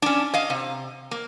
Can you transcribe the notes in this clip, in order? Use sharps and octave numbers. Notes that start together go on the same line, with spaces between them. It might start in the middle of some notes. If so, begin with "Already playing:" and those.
C#4 D4
D#5 F5
C3
A#3